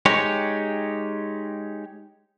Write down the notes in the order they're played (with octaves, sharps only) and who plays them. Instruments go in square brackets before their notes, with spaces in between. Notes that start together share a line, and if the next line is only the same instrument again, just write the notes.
[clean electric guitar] G#3 D#4 G4 C#5